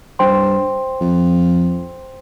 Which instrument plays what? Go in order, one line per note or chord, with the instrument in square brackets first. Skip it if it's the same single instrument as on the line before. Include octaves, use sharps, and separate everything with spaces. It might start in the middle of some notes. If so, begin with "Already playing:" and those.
[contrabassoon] G2 [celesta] C5 G5 C6
[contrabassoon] F2